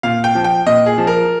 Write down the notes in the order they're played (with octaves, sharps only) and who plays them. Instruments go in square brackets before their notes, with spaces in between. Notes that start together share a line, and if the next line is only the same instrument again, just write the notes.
[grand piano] A#2 F5
G5
F3
G5
A#2 D#5
G#4
F3
A#4